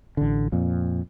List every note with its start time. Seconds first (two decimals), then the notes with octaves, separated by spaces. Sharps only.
0.17 A1 D3
0.52 F2 A#2